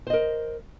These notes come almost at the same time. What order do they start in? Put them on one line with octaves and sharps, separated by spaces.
C5 D#5 A#4